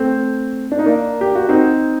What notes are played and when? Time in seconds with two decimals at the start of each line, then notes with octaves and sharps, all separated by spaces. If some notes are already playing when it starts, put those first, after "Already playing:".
Already playing: A3 C4
0.72 D4
0.79 D#4
0.86 A#3 D4
1.21 G4
1.35 F#4
1.49 C4 D#4